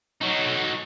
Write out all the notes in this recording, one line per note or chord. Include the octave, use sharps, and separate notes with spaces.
F#3 D#4